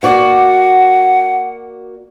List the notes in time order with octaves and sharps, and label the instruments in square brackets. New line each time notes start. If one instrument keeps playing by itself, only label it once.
[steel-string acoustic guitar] A#3 F#4 D5 [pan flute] F#5